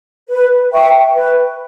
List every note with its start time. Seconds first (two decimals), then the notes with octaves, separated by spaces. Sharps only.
0.29 B4
0.72 E5 G5 C#6
1.14 B4